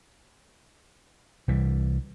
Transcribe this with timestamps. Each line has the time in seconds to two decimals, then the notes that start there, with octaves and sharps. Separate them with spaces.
1.48 C2 E3 G3